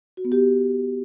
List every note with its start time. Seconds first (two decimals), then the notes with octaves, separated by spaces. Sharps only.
0.17 F#4
0.25 B3
0.32 G4